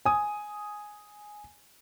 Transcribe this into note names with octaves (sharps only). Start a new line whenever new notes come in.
G#5 D#6